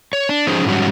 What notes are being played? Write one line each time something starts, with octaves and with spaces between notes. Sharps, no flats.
C#5
D4
F3 C#4 D#4 G#4 C5
G#2 F3 G3 C#4 F#4